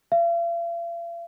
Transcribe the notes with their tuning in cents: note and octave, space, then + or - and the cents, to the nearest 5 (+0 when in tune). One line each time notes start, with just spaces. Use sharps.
F5 -45